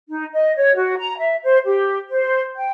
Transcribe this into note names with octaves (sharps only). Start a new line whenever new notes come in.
D#4
D#5
C#5
F#4
A#5
E5
C5
G4
C5
G5